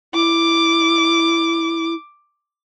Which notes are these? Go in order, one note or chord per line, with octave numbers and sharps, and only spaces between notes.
E4 D6